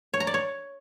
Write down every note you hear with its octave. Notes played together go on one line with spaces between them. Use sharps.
C#5
A#5
D5
C#5